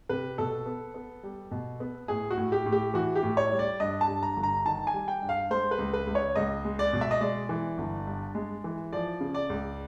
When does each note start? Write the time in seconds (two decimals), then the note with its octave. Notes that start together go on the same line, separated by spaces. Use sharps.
0.09 C3 B4
0.38 B2 A4
0.66 B3
0.94 B3
1.23 G3
1.51 B2
1.80 B3
2.08 A2 G#4
2.31 F#4
2.38 A2
2.52 G4
2.66 A2
2.72 G4
2.94 E3 F#4
3.16 G4
3.23 A2
3.37 C#5
3.52 G3
3.59 D5
3.80 G2 D#5
4.01 A5
4.08 G2
4.23 A#5
4.37 G1
4.43 A#5
4.66 D#3 A5
4.87 G#5
4.94 G3
5.08 G5
5.22 G2
5.29 F5
5.50 G#3 C5
5.71 B4
5.78 C#2
5.93 B4
6.07 C#2
6.15 C#5
6.36 C#2 D#5
6.65 G#3
6.79 D5
6.93 B2
7.01 E5
7.11 D#5
7.21 G#3 D5
7.49 E3
7.78 G1
8.07 G2
8.35 G#3
8.64 E3
8.93 F3 D5
9.20 C#3
9.34 D5
9.50 C#2